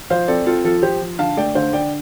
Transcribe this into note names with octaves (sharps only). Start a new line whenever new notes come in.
F3 C5 F5
C4 A4 D5
C4 F4 A4
F3 F4 A4
F3 G4 C5
F3
D3 F5 A5
A3 D5 G5
D3 C5 F5
D3 D5 G5